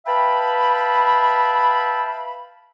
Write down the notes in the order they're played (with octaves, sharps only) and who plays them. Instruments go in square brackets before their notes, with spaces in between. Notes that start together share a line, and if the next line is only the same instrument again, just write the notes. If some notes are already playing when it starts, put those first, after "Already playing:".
[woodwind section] B4 E5 F5 G5 A5 B5